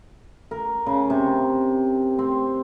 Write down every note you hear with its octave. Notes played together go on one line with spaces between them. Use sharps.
A#4
C#3
C3
C4